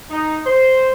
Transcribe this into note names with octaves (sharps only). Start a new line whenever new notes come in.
D#4
C5